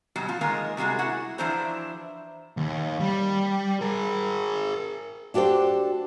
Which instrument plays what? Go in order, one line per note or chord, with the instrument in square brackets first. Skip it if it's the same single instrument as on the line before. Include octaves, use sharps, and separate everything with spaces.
[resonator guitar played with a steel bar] G#2 B2 F#3 G3
F3 F4
D#3 G#3 A#3 A#4 D#5
C3 G3 G#3 F#4 G#4
E4 F#4 F#5
E3 F3 D4 E4 C5 A#5
[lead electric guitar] D#2
G3
G#4 A#4
[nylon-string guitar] D4 F#4 G4 A4 C5